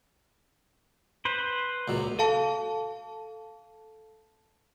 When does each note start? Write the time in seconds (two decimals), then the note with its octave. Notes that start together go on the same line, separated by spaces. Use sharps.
1.25 B4 C5
1.88 C#2 A#2 F#3
2.19 A4 F5 A5